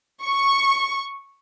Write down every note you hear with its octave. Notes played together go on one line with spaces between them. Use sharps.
C#6